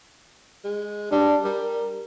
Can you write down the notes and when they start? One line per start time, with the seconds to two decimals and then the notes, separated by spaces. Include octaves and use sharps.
0.64 G#3
1.12 G3 D4
1.44 G3 A#4